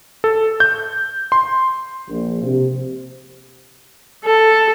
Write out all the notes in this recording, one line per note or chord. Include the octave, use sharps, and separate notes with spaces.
A4
G6
C6
A#1
C3
A4